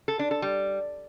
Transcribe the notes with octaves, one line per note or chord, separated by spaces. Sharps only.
A4
D4
A4
G3